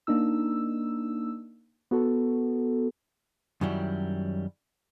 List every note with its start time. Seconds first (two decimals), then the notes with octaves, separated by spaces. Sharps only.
0.07 A#3 D4 D#4 E6
1.91 B3 F#4 A4
3.61 F#2 D#3 F#3 G3 E4